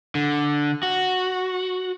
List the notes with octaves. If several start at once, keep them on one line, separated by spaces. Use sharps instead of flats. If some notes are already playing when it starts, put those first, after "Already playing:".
D3
F#4